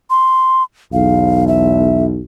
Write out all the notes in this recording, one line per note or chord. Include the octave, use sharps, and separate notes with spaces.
C6
B1 E2 F5
E5